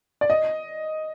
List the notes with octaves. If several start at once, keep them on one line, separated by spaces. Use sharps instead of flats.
D5
D#5